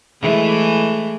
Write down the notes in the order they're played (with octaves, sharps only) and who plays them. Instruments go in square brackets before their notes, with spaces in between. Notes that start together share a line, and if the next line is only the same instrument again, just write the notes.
[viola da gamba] E3 G#3 A3